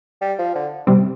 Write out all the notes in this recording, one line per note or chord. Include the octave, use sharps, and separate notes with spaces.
G3
F3
D3
C3 G3 C4